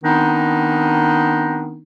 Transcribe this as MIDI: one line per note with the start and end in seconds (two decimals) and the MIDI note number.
0.04 1.81 51
0.04 1.81 59
0.04 1.81 60
0.04 1.81 62
0.04 1.81 63